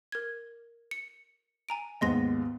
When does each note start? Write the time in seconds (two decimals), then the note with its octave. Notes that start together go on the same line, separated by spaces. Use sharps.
0.12 A#4 G#6
0.91 C#7
1.69 G#5 A#5 D7
2.01 D#2 G#2 B3 D#5 C6 A#6